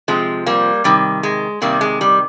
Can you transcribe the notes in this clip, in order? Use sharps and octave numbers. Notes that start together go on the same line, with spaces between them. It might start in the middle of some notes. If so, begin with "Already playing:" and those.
C3 F3 G#3
G3 A#3
C3 D#3 G3
G#3
C3 D#3 G3 A#3
G#3
G3